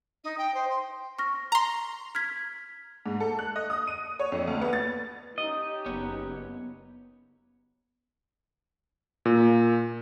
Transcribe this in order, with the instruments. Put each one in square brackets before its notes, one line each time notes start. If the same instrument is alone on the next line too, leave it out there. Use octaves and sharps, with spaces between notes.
[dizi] D#4
G5
C5
C6
[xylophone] C#6 F6 A#6
[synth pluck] A#5 C6
[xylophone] F6 G#6 B6
[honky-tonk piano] G#2
A4
F#6
D#5
D#6
D#7
C#5
F2
D2
B3
A6
[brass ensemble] C#4 D#4 G4 [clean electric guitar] D#5
[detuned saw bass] F#1 [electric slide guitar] B3 C#5
[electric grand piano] A#2